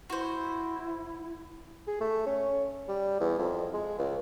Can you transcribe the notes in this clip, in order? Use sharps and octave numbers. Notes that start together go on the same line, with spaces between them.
E4 F#4 C5
G#4
A3
C#4
G3
E2
F2
G#3
C#2